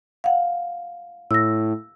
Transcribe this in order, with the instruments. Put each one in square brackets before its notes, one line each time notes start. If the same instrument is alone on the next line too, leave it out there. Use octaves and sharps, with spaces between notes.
[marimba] F5 F#5
[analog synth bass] A2 [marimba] E6 A#6